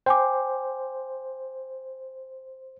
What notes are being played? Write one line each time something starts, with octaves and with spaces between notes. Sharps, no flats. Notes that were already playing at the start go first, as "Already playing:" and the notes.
C5 G5 G#5 D6